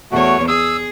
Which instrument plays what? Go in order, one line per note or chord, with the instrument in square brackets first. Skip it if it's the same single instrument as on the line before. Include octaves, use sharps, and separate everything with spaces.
[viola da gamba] E2 C#5 [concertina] A3 F#4
[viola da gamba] G#4 [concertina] D#6 E6